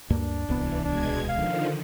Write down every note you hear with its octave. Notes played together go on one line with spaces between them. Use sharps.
D2 G2 A#3 D4
D1 C2 E3 B3
B2 G#3 D4 G#6
D3 D#3 F3 F5